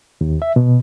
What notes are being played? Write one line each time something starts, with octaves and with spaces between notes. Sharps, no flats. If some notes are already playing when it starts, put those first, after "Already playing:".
D#2
E5
B2